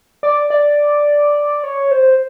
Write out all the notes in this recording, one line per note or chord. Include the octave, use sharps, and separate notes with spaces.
D5
D5
C#5
C5